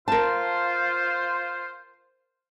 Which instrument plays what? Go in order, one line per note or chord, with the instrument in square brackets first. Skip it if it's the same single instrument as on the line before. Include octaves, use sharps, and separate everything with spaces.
[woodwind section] F4 C5 [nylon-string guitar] A#4 A5